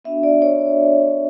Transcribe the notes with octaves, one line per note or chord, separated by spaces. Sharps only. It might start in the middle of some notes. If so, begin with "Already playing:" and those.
B3 D4 F#4 E5
D5
C#5